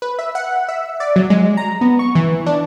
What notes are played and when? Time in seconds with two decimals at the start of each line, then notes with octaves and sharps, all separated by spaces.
0.02 B4
0.19 E5
0.35 F#5
0.69 E5
1.00 D5
1.16 F#3
1.30 G#3
1.57 A#5
1.81 B3
1.99 C#6
2.15 E3
2.46 D4